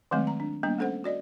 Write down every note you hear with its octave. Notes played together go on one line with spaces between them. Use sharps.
D#3 F#3 G#3 A3 C4
A#5
D4
G3 A#3 B3 D4
A3 C#4 A4 C5 F#5
F#4 D5 D#5